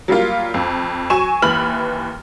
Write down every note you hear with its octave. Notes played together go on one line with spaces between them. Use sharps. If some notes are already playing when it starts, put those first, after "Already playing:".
F#3 G3 A#3 F4
F2
F#3 G#5 C#6 E7
D#2 E3 B5 F6 F#7